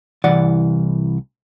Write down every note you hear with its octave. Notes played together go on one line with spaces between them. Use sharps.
C2 E3 D5 F#5